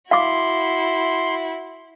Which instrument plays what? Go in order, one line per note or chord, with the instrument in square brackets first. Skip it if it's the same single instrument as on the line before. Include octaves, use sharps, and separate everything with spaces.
[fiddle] E4 F#4 [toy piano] F5 D6 [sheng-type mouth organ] C6